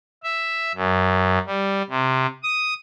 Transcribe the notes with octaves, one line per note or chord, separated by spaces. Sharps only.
E5
F#2
G3
C3
D#6